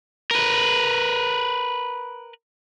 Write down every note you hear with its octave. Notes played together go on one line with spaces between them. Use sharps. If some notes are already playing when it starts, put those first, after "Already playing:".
A#4 B4